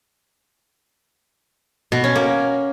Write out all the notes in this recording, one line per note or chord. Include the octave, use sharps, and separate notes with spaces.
B2
C#4
A#3